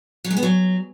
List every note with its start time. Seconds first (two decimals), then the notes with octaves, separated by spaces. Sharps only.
0.24 F#3
0.31 G#3
0.37 B3
0.43 F#3